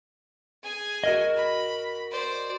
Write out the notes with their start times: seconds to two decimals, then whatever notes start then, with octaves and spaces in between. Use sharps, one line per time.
0.63 G#4 G#5
1.04 F#4 A#4 D#5
1.36 B5
2.11 C5 D5